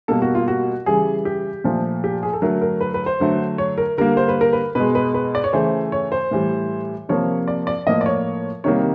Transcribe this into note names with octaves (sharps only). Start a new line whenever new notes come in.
B2 G3 A#3 A4
F#4
F4
F#4
C#3 E3 G3 G#4
G4
A#2 F3 A3
G4
G#4
A4
D3 F#3 A3 A#4
A#4
B4
B4
C5
D3 F#3 A3
C#5
A#4
D3 G3 A#3 A#4
C5
B4
A#4
B4
B2 G#3 B4
B4
B4
D5
C#5
C#3 E3 A3 C5
C#5
C5
A2 E3 G3
C3 F3 A#3 C#5
D5
D5
A2 F3 A#3 D#5
D5
C#5
C3 D#3 G3 A#3 C#5